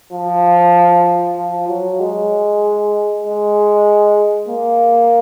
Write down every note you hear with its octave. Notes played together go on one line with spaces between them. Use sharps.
F3
F3
F#3
G#3
G#3
A#3